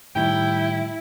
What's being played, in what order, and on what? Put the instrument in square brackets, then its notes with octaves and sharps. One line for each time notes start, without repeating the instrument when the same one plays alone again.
[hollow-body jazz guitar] A2 D#3 G3 [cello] E4 [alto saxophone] G5